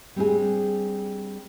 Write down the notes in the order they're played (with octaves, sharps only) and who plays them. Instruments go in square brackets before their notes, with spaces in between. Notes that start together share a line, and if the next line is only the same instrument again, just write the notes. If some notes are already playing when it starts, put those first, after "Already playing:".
[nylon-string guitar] G3 C4 D4 G#4